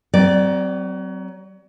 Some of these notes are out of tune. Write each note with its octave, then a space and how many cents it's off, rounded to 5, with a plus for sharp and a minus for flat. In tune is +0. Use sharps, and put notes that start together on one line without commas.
F#3 +30 C4 -15 D5 +0